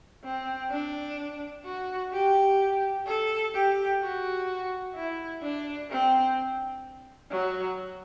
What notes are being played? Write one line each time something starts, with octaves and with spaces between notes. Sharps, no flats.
C4
D4
F#4
G4
A4
G4
F#4
E4
D4
C4
F#3